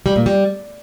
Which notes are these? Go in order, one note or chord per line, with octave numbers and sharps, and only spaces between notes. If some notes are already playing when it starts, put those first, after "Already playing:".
G3
A#2
G3